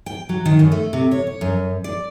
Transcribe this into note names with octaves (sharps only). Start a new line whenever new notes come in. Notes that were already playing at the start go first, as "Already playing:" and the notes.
G5
F#3
D#3
F#2
A3
C3
C#5
C#5
F#2
D5